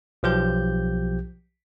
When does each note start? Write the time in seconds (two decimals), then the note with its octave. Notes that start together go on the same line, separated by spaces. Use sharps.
0.23 B1 F3 G4 G6